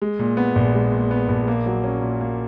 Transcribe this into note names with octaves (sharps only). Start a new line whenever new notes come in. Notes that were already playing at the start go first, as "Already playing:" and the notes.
G#3
A#2
B3
A#1
G#3
A#2
B3
A#1
A#3
F#3
C#4
A#2
A#3